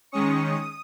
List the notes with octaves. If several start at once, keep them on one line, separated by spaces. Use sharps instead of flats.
D#3 G#3 C#4 C#6 D#6
D#6